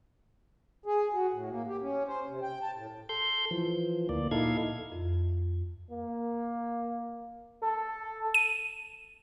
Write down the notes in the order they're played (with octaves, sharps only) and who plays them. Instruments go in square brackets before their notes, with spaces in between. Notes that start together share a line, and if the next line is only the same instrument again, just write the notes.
[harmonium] G#4
F#4
A2
A#3
G4
C#4
C5
C3
G5
A5
A2
[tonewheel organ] A4 C6 G6
E3 F3
D2 A#3 D5
A#2 D#4 E4 A4 F5 G#6
[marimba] F2
[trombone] A#3
A4
[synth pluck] D#7